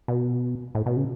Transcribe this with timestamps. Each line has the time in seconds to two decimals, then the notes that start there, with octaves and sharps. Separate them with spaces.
0.08 B2
0.75 A2
0.86 B2
0.97 C#3